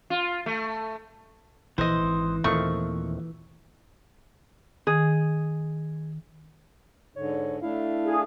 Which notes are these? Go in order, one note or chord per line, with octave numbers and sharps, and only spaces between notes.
F4
A3
A#1 E3 C5 D#5
G#1
D#2 A#2 D#3 F3 A3 C4 C#6
D#3 G#4
G#2 D3 C#5
A3 D4 E4 F5
G#4